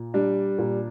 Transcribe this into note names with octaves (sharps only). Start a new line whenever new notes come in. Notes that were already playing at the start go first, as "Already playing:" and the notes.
Already playing: A#2
G3 D4
A#2